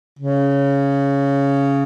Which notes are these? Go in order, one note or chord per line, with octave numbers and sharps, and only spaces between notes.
C#3